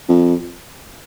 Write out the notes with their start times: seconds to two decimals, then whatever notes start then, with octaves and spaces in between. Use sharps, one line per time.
0.09 F2